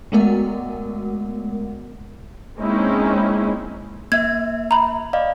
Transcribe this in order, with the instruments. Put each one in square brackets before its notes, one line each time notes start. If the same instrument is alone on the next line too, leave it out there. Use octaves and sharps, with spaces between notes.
[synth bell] G#3 A3 B3 F#4 A#4 F#5
[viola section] G#3 A#3 C4 C#4 D#4 E4
[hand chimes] A#3 E5 [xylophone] G#6
[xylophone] A#5 B5
[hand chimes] D5 D#5 F5